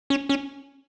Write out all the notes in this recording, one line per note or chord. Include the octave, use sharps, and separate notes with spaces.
C#4
C#4